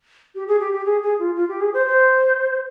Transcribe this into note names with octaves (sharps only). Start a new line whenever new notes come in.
G4
G#4
G4
G4
G#4
G#4
F4
F4
G4
G#4
C5
C5